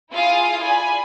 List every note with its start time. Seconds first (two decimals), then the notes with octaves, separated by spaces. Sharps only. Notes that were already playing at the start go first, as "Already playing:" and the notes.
0.12 E4 F4 G#4 F5 D#6
0.62 D5 G#5 B5